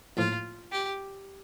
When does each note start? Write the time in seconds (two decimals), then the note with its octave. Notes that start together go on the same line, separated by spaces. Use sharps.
0.17 A#1 A2 F3 F4
0.72 G4